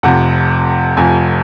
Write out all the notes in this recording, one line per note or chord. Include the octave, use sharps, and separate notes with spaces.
F1 F2 C3 F#5
F1 F2 C3 G#5